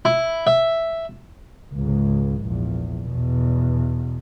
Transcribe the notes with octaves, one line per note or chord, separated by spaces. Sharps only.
E4
E5
C#2 G#2
A#1 E2
E2 B2